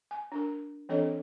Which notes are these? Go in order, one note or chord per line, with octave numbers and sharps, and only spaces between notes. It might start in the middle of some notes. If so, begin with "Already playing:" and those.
G#5
D4 A#4
E3 C4 D4 A4 C#5 D#5